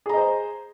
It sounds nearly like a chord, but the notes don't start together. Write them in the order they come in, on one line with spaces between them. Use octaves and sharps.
G#4 A#5 D#5 C5